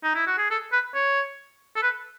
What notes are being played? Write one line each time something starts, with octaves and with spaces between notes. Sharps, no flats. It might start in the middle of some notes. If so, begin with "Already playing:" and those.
D#4
E4
F#4
G#4
A4
B4
C#5
A4
B4